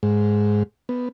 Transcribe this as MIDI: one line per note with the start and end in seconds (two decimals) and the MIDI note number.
0.03 0.63 44
0.89 1.09 59